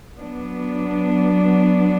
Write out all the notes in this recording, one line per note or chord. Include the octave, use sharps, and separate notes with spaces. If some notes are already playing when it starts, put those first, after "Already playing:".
F#3 B3 D4